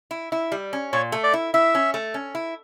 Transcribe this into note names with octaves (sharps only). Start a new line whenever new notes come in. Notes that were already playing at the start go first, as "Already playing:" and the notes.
E4
E4
G3
C#4
A#2 C#5
A3
D5
E4
E4 E5
C#4
A3
C#4
E4